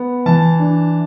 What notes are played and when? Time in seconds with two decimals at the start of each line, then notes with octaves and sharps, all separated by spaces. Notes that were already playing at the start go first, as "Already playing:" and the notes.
Already playing: B3
0.26 E3 A5
0.60 D4